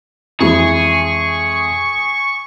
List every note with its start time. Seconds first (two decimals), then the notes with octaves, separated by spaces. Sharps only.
0.40 F2 E3 G#3 G#4 C#6